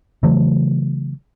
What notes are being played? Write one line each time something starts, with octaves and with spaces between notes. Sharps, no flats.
C#3 E3 F#3 A3